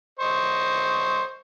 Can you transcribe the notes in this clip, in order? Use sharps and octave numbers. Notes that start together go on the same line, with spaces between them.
C5 D#5 C#6